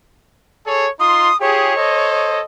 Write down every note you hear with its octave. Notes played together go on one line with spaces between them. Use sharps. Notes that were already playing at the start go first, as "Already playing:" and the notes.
G#4 A4 C#5
D#4 F4 C6 D#6
F4 G4 G#4 C#5
A4 C5 D#5